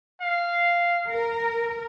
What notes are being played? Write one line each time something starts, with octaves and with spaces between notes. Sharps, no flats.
F5
A#4